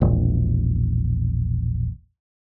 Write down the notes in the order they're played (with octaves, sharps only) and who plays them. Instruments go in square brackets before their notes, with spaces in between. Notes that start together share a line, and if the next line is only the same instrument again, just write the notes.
[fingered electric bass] E1 A#1